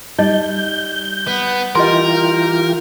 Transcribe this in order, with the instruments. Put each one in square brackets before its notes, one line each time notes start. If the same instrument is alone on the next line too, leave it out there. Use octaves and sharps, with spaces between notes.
[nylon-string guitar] G3 [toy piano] D#4 D#5 [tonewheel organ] G6
[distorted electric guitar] B3
[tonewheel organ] E3 F4 G4 [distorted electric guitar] A#4 [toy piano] D#5 C6